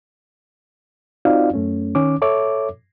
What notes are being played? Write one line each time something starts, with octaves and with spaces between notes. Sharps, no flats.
C4 D#4 F4 F#4 D5 F5
F#2 A3 C#4
D#3 C#4 D6
A4 C#5 E5 D6